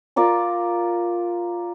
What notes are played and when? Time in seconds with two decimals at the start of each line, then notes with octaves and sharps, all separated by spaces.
0.16 F4 A#4 D5 D6